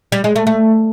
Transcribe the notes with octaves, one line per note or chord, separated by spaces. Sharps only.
G3
G#3
A3
A3